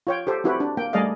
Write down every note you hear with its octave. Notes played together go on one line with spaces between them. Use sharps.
F4 C#5 G5
G4 A4 C5
C4 E4 F#4 G4 B4
D4
A#3 G5
G3 A3 G#4 D5 D#5 F5